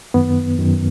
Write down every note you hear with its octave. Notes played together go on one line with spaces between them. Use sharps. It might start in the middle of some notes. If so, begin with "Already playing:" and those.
F#2 D#3 B3
F#2 D#3